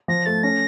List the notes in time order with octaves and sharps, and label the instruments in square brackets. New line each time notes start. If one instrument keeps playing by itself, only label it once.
[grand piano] F3 [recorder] A#6
[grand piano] A3 [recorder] A6
[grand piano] C#4 [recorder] A#6